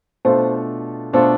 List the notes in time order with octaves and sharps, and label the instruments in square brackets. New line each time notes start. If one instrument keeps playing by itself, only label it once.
[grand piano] B2 A3 D4 F4 A4 [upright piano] C5
[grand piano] B2 A3 D4 F4 A4 [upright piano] C5